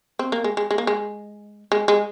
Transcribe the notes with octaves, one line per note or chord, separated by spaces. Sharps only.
C4
A#3
G#3
G#3
G#3
A#3
G#3
G#3
G#3